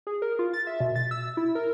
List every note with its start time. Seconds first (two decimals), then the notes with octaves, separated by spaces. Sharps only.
0.07 G#4
0.22 A#4
0.39 F4
0.54 A6
0.67 E5
0.81 B2
0.96 A6
1.11 E6
1.37 E4
1.55 A#4